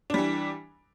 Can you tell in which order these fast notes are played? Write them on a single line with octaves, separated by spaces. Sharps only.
D4 G3 E3